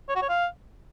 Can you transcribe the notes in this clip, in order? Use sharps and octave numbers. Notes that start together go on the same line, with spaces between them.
C#5
F#4
C#5
F5